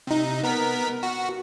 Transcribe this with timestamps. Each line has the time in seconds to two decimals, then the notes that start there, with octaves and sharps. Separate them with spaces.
0.07 C3 D#4
0.43 B3 A#4 B6
1.03 F#4